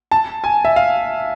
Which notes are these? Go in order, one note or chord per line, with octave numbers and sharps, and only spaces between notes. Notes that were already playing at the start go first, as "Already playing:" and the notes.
A5
G#5
E5
F5